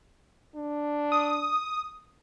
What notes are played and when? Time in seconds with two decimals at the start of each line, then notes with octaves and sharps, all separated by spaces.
0.55 D4
1.12 D#6